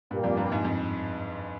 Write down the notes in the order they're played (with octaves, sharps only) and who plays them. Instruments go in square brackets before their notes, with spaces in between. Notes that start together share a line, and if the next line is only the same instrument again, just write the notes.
[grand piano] G2 [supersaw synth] A#2 G3 A#3
[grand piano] F2
G2
G#2
F2